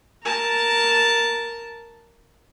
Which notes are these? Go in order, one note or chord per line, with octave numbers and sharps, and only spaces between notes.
A#4 A5